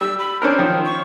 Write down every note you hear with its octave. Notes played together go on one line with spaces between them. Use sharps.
G3 E6
B5
C#4 D4 A#4 C5
D#3 F3
C#6